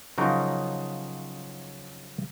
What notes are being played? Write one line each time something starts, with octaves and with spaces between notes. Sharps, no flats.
C#3 F3 F#3 D#4 A#4